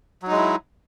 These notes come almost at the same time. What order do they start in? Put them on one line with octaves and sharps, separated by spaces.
F#3 D#4 G#3 E4